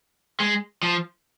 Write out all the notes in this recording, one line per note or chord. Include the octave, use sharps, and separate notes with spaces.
G#3
F3